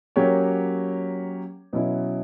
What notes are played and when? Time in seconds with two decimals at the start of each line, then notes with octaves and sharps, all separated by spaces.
0.16 F#3 A#3 C#4 G4 C#5
1.73 B2 F#3 C#4 E4